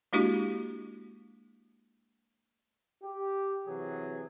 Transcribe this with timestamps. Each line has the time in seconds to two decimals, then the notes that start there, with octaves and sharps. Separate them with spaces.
0.13 G#3 A#3 D4 E4 F#4 G4
3.04 G4
3.67 C3 E3 F#3 G#4